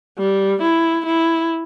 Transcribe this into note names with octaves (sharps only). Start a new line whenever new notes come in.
G3
E4
E4